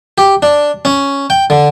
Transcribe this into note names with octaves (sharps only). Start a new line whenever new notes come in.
G4
D4
C#4
G5
D3